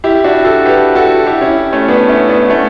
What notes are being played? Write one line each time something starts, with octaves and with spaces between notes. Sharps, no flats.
E4 G4
D4 F#4
F#4 A4
G4 B4
F#4 A4
E4 G4
C#4 E4
A3 C#4
B3 D4
A3 C#4
B3 D4
A3 C#4